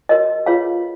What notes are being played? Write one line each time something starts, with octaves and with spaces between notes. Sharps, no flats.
F#4 A#4 C#5 D#5
F4 G#4 B4 C#5 F5